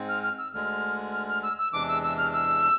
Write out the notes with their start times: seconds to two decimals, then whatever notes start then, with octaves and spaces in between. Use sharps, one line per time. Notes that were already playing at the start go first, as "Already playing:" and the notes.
Already playing: G#2 G#3 C4
0.09 F6
0.23 F6
0.38 E6
0.53 D2 D3 G#3 F6
1.13 F6
1.28 F6
1.43 E6
1.58 E6
1.73 E2 C3 E3 G#3 D4 D6
1.88 E6
2.03 E6
2.18 F6
2.33 E6